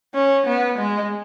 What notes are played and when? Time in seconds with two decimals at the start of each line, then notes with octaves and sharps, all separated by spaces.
0.14 C#4
0.47 B3
0.79 G#3